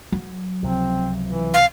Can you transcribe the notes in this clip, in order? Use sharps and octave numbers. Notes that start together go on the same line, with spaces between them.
F#3
C#2 C3 F3 C4
E3
F5